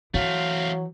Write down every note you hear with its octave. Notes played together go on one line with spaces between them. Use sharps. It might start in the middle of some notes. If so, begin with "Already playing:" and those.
E3 F#3 A3 C4 F5